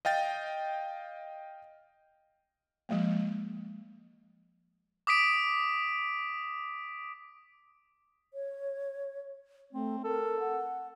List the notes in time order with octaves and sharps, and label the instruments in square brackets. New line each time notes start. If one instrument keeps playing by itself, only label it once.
[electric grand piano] D#5 F5 G5 A6
[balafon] F3 G#3 A#3
[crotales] D6 D#6 B6 D7
[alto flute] C#5
[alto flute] A3 [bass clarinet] C4
[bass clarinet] A4 [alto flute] A#4
[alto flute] F#5